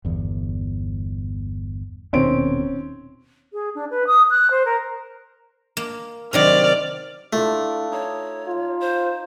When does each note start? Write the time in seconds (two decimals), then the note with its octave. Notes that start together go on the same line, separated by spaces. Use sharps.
0.05 G1 E2
2.13 D#1 B2 D#3 C4 C#4 D7
3.53 G#4
3.75 D4
3.90 B4
4.07 D#6
4.30 F#6
4.50 C5
4.65 A#4
5.77 A#3
6.33 C3 D#3 F#3 D5 F6
7.33 A3 D4 E4 F4
7.92 D#4 C#5
8.48 F4
8.80 C5